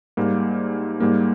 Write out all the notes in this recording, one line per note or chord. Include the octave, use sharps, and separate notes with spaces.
G#2 G3 A#3
G#2 G3 A#3